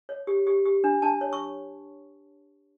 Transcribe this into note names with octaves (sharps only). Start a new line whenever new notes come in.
C#5
G4
G4
G4
D4
D4 A5
C#5
C#6